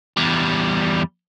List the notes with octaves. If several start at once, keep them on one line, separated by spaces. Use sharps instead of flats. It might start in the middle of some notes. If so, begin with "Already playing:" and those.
E2 G3